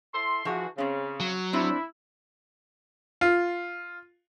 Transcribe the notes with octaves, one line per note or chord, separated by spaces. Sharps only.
E4 A4 C6
E3 F3 F#4 G#4
C#3 C4 C#4
F#3
C4 D4 E4
F4